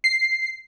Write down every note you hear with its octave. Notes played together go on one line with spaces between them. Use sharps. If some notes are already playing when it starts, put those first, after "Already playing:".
C7